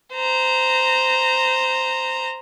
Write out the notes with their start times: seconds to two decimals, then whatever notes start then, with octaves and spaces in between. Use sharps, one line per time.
0.14 C5 A#5